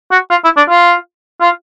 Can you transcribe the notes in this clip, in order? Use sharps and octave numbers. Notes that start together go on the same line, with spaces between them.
F#4
F4
E4
D4
F4
F4